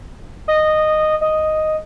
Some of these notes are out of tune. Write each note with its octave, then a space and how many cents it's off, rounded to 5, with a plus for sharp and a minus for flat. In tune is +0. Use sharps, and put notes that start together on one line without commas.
D#5 -10
D#5 +0